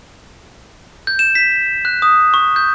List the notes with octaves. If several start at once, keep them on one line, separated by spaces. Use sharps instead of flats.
G6
E7
B6
F#6
D#6
C#6
G6